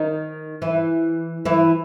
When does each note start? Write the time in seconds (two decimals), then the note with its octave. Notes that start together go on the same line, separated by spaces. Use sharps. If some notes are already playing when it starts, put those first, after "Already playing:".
Already playing: D#3 D#4
0.62 E3 E4
1.45 E3 E4